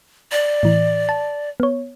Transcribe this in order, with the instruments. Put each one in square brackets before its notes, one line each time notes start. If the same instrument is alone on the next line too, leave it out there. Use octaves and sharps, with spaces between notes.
[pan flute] D5
[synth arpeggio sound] A2 E3
A5
B3 C#5